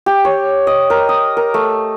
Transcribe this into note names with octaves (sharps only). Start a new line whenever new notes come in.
G4
C#5
D#5
A#4
D#6
A#4
A3